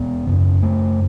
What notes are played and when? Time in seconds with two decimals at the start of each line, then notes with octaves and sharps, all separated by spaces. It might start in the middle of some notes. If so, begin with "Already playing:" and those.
Already playing: E2 B2 B3
0.27 F#2 C#3
0.63 A3